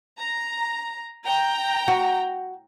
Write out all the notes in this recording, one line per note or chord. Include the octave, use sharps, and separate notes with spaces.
A#5
G5 A#5
F#4